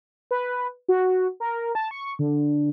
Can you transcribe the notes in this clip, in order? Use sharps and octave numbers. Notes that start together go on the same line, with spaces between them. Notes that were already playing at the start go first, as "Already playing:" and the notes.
B4
F#4
A#4
A5
C#6
D3